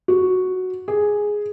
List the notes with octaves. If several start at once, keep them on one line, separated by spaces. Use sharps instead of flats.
F#4
G#4